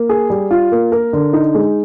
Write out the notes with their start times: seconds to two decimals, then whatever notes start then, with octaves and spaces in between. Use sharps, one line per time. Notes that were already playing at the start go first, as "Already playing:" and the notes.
Already playing: A#3
0.09 G#4
0.30 G3
0.51 F4
0.72 A#3
0.92 A#4
1.13 D3
1.33 D#4
1.55 G#3